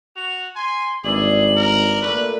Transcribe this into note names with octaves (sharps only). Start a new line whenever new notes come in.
F#4 F7
G#5 C6
G#1 G2 G#4 D5 E5 F#7
A#4
A#2 A3 A#3 B4